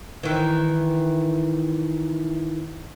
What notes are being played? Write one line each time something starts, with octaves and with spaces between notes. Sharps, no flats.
D#3 E3